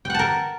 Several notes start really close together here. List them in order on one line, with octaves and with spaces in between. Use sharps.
G5 F#5 A5 A#4